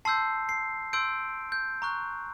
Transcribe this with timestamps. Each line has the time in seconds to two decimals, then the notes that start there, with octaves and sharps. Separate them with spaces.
0.05 A5 C6 E6 G6 C7
0.49 C7
0.93 C6 E6 G6 D7
1.52 G6
1.82 A#5 C#6 F#6